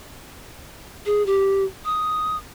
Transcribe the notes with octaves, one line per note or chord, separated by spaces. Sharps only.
G#4
G4
D#6